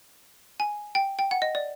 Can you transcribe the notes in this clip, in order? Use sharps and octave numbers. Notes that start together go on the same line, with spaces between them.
G#5
G5
G5
F#5
D#5
D5